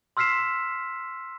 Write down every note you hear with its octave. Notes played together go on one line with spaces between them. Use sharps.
C6 E6 F6 B6 C7 E7